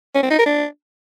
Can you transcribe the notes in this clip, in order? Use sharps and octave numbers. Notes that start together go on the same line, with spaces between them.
C#4
C4
D#4
A#4
D4